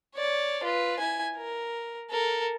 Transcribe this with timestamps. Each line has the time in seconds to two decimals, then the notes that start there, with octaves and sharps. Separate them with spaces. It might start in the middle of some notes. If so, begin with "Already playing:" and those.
0.16 C#5 D5
0.64 F4 B4
0.99 E4 G#5
1.37 A#4
2.11 A4 A#4